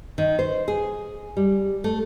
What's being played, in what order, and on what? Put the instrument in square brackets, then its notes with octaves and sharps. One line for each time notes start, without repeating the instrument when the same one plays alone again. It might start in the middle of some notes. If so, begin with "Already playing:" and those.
[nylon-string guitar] D#3
C5
G#4
G3
A3